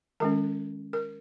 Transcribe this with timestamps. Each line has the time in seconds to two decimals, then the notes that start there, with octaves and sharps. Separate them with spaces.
0.20 D#3 G#3 C#4 A#4
0.93 A#4